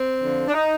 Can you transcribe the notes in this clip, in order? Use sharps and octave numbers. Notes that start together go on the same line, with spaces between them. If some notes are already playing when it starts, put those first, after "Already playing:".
Already playing: C4
F2 D3 F3
D4
D#4